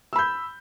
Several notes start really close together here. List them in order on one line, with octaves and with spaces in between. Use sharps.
E6 B5 G6